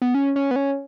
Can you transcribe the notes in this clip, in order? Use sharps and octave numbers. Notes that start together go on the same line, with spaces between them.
B3
C#4
C#4
B3
C#4